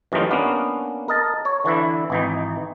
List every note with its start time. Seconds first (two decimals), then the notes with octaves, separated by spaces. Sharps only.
0.12 F#2 E3 G3 A3 D#4 F4
0.31 A#3 B3 C#4 D4
1.08 A#4 D#5 A5
1.45 C#5
1.64 D3 E3 D4 E4
2.10 G#1 E3 D#4